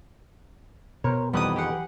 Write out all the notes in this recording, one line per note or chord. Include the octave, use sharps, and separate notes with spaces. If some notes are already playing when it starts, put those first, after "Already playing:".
B2 A#4 C5 C#5
F2 D#3 E3 G3 B3 B4 D#6
G4 G#4 F#5